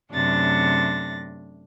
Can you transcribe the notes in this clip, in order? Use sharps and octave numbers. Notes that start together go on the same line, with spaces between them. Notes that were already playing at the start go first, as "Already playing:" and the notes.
F#2 C3 A3 D4 A6 A#6